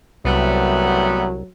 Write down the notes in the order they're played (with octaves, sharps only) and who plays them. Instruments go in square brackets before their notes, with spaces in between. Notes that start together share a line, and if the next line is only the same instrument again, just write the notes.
[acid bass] C2 [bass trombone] F#3 [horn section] G3 A3 B3